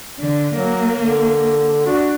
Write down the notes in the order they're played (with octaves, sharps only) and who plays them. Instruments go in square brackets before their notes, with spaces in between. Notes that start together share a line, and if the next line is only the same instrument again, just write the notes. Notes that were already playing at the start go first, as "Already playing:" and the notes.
[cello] D3
[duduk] F#3 [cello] A#3
[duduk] D3
[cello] D4 [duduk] F#4